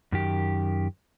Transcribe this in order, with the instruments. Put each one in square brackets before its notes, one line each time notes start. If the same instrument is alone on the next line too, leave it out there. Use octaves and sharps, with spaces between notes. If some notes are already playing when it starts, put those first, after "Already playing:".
[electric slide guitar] F#2 D#3 G4